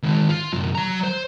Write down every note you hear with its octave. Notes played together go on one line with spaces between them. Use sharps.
D#3 G#3
F4
C2 F#2
F#3 A#5
C5